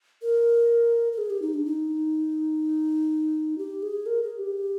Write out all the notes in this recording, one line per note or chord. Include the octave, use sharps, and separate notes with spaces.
A#4
A#4
G#4
G4
D#4
D4
D#4
G4
G#4
A#4
G#4
G4